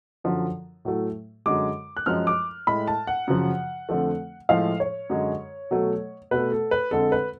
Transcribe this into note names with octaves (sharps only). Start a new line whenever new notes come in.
F#2 D3 F3
A2 F#3 A3
F#2 D3 G#3 D6
F#6
F#2 F3 G#3 F6
D6
A2 G#3 B5
A5
F#5
F#2 C#3 F3
F2 D3 F3 A3
A2 F3 G#3 F5
C#5
F#2 D3 G#3
B2 F#3 A3
B2 A3 B4
A4
B4
F2 D3 G#3 A4
B4